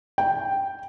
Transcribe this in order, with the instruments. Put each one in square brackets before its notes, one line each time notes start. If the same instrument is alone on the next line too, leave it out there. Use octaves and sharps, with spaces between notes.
[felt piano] G5